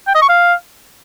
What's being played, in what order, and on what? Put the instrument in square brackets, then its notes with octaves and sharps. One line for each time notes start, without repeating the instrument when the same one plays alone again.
[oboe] G5
D#5
C#6
F5